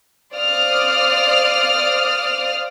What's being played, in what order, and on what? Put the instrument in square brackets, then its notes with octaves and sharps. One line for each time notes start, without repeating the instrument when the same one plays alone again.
[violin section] C5 D5 F5 D#6 F6